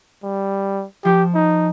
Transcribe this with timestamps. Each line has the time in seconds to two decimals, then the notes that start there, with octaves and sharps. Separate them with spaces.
0.23 G3
1.05 F3 G4
1.34 D#4